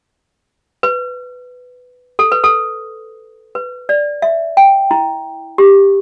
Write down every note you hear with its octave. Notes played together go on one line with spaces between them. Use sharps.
B4
A4
B4
A4
B4
D5
E5
G5
E4
G4